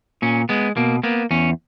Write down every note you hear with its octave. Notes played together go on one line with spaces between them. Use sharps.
A#2 C#4
G#3 B3
B2 A#3
A#3 B3
E2 C#4